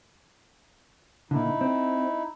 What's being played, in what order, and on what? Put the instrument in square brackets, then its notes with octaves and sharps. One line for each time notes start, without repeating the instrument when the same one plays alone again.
[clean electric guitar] A#2 D3 [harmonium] D#4 E4
[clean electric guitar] C4